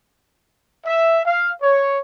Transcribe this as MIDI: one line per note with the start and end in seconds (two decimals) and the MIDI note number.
0.86 1.21 76
1.25 1.52 77
1.62 1.98 73